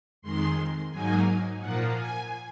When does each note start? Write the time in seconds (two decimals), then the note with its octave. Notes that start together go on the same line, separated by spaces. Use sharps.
0.22 F2 D#3 G#3 C6
0.91 G#2 F#3 A#3 D#4 G#5
1.60 A#2 F3 A#3 F4 F#5
1.95 G#5